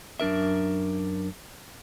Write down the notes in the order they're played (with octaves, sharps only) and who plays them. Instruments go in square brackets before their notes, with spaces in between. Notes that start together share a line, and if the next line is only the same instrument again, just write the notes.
[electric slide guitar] F#2 D4 A#4 E5